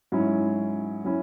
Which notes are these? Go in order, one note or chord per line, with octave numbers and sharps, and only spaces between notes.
G#2 F#3 C#4 E4
F#3 C#4 E4